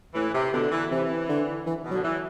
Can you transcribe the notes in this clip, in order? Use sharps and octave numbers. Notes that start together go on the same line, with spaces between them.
A2 E3
C3
B2 D3
E3
C3 E3
D3
E3
B2
F#3
D3
E3